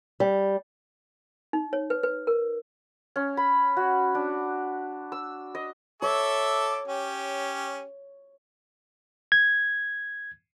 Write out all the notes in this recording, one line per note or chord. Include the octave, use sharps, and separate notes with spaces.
G3
D#4
C#5
B4
B4
A#4
C#4
B5
F#4
D4
E6
D#5
A4 C#5 E5 D6
C#4 G4
G#6